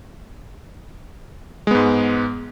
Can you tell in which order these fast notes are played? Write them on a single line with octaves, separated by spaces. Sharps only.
G#3 B3 G#2